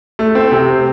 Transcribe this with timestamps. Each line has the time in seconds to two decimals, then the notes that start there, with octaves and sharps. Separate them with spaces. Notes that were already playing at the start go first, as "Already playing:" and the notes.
0.19 A3
0.35 C4
0.52 C3